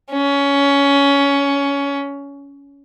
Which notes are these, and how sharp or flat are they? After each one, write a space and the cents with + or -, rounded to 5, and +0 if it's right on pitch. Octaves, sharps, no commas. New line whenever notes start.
C#4 +20